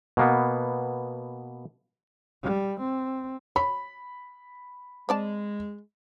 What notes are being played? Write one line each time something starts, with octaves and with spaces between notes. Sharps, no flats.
B2 A#3 B3
G3
C4
C#5 B5
G#3 C4 D5 A5